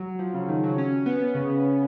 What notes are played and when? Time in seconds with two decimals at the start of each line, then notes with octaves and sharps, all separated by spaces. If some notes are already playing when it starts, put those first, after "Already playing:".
Already playing: F#3
0.19 F3
0.34 C#3
0.48 D#3
0.63 F#3
0.78 C#4
1.06 B3
1.35 C#3